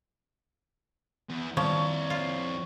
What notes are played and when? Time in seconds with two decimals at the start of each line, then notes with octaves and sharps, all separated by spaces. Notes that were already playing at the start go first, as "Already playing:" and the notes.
1.30 E2
1.57 F2 D#3 F3 G3 C#5 D5
2.10 F4